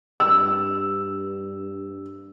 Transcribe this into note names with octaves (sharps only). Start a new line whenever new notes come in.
G2 E6